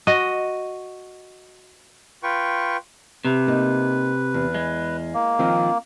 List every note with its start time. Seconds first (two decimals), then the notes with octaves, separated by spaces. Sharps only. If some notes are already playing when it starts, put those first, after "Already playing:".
0.07 F#4 D#5
2.23 F4 B4 G5 C#6
3.25 C3 B4
3.47 A#3 D#4
4.34 E2
4.54 G#3
5.14 A#3
5.39 D#3 F3 C4